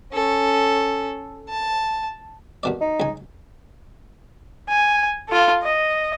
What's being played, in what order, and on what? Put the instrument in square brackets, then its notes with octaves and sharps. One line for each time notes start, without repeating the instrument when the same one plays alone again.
[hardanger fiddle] C#4 A4
A5
[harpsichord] D#2 B2 D5
[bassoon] D#4
[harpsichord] C#2 G#5
[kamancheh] G#5
F4 A4
D#5